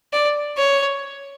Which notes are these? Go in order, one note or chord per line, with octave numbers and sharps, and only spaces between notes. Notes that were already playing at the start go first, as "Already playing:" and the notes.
D5
C#5